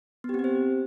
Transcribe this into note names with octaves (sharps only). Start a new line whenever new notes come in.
B3
G4
C4
G4
C5